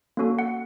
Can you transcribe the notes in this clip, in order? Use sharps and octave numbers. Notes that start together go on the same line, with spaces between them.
A#3 C#4 F#4 A4
F#5